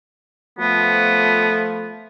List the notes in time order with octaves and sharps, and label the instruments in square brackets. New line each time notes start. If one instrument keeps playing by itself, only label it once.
[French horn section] F3 A3 [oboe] B3